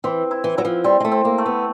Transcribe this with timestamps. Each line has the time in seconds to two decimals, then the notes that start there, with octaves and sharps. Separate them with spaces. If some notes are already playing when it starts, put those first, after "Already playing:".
0.04 E3 C4
0.31 E4
0.44 E3
0.58 F#3 E4
0.65 F3
0.84 G3 C4
1.00 G#3
1.05 A3
1.12 C4
1.25 A#3
1.38 A3
1.46 B3